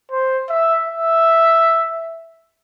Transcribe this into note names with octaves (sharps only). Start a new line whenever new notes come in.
C5
E5
E5